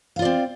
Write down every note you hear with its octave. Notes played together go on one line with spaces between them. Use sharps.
C4 F4 D5 F5